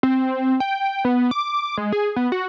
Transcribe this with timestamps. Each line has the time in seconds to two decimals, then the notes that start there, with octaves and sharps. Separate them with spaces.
0.03 C4
0.60 G5
1.05 B3
1.31 D6
1.77 G#3
1.92 G#4
2.16 B3
2.32 F#4